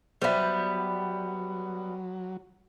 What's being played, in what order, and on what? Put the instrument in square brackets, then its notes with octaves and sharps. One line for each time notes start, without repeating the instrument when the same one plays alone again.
[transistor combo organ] F#3 [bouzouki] G3 B3 [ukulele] C5 D5 E5